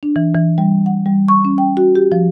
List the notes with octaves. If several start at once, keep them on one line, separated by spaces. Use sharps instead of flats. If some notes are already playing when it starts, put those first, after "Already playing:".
D4
E3
E3
G3
F#5
G3
C#6
C#4
G5
F#4
G4
F3